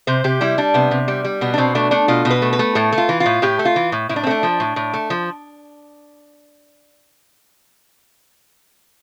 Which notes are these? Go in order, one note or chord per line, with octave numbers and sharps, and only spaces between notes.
C3 C5
C3 G4
G3 E4
G3 D4
C3 B3
C3
G3
G3
B2 B3
D4
B2 C4
A3 D4
A3 D4
B2 F4
B2
B4
A3
B4
A3
A2 A4
A3
F4
E3
F4
A2
A2 G4
A3
F4
E3
A2
A2 E4
D4
C4
A3 D4
F3
A2
A2
A3
F3